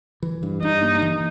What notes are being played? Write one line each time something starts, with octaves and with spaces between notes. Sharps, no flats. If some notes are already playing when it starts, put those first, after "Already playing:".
E3
G2
G2 D#4
A#3
E3